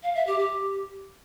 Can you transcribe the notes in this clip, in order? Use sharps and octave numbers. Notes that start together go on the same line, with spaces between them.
F5
E5
G4
G4